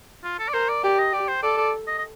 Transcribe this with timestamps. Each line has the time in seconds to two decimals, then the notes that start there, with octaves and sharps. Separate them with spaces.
0.24 F4
0.39 A4
0.48 D5
0.53 A#4 C5
0.69 D5
0.83 G4 D5
0.98 D#5
1.12 G4 D5
1.28 C5
1.43 A4 D5
1.58 D5
1.87 D#5
1.98 D#5